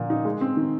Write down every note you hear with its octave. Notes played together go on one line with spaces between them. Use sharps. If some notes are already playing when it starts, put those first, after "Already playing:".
Already playing: A#2 D3 F3 A#3
D#4
G#3
C4
D#3